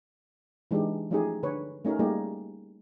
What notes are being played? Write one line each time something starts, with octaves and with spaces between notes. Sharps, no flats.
E3 G#3 D4 D#4 G4
F3 A3 C#4 D#4 G4 G#4
D3 B4 C#5
A3 C#4 D#4 G4 A#4
G3 A3 A#3 D#4 G4 G#4